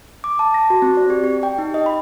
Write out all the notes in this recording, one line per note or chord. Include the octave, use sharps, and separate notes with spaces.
D6
A5
A#6
F#4
C4
D5
G4
G4
G5
D#4
D#5
B5